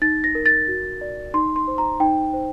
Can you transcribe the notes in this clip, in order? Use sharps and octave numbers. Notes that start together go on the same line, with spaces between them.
D#4 A6
A#6
A#4
A6
F#4
D5
D#4 C6
C6
C5
A#5
D#4 G5
C5